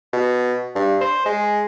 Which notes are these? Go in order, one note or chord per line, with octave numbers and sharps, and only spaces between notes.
B2
G2
C5
G#3